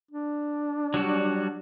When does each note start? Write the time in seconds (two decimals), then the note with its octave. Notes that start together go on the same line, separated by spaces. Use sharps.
0.11 D4
0.94 F#3 G3 F#4